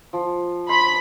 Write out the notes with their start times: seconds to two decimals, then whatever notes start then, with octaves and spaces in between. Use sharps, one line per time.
0.13 F3
0.69 B5 C6